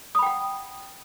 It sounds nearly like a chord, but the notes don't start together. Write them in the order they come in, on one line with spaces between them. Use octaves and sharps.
D#6 B5 G5 F#5